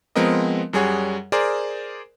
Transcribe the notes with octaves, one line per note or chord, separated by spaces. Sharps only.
F3 G#3 B3 C4 A#4 D#5
F#2 G3 G#4 C#5 F#5
G#4 A#4 C5 D5